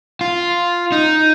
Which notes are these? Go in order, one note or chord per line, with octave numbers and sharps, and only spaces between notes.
F4
D#4